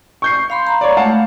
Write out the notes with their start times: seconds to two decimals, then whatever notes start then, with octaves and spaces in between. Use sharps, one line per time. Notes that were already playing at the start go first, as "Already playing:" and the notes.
0.22 C#6 G6 C7
0.50 F5 B5 C6
0.65 F5 A#5 B5
0.81 C#5 D5
0.97 G#3 A3 F5 F#5 A5